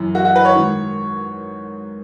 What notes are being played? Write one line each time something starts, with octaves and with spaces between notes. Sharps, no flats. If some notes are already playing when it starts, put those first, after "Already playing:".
Already playing: F#2 E3
F#4
F#4
B4
C#5
G#2 D#3